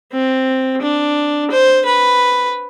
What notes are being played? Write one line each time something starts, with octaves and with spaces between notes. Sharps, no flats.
C4
D4
C5
B4